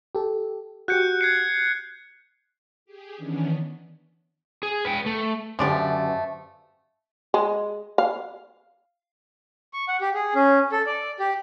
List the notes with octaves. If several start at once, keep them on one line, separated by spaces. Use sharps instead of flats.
G4 A4
F#4 G4 F#6 G6 C#7
G#6 C7 C#7
G4 G#4
D#3 E3 B3 C#4 D4
G#4
B4 G5
A3
F#2 D3 F3 G#3 A3 G4 B4 D5
G#3
F5
C#6
F#5
G4
G#4
C#4
A4
D5
G4